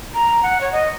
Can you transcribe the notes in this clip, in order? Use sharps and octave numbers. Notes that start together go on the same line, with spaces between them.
A#5
F#5
C#5
D#5